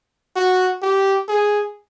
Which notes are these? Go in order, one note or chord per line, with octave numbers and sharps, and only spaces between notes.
F#4
G4
G#4